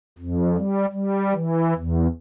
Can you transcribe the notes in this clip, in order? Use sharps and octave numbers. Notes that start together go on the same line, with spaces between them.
F2
G3
G3
E3
E2